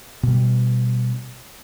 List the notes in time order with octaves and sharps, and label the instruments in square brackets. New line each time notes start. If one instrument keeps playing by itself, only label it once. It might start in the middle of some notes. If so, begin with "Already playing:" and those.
[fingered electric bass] B2 G3